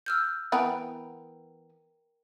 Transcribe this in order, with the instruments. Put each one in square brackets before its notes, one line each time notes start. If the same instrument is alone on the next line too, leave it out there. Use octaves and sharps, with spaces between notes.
[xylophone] E6 F6 G6
[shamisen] E3 B3 B4 [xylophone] A#4 G5 A#5